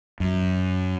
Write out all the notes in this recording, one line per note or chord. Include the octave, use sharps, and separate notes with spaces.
F#2